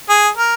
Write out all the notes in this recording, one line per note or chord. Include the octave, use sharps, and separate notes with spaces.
G#4
A#4